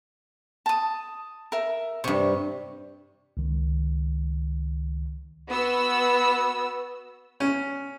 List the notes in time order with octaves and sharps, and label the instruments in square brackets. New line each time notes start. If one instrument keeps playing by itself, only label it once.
[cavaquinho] A5 D#6
A#4 E5
[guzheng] G2 C3 [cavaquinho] C#6
[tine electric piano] C#2 D#3
[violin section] B3 F#4 E6
[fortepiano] C#4